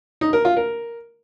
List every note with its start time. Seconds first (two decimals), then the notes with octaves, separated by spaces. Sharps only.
0.21 D#4
0.33 A#4
0.45 F4
0.57 A#4